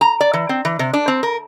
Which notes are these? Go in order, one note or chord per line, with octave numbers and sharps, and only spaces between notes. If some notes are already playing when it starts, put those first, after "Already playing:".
A#5
D5
E3
C4
E3
C3
D4
C4
A#4